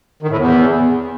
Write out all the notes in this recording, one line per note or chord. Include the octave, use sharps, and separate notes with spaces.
D#3
A2
E2